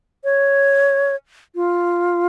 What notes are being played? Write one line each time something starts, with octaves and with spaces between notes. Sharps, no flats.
C#5
F4